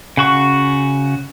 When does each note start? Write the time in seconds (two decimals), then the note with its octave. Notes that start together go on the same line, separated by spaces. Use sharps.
0.17 C#3 F#4 C#6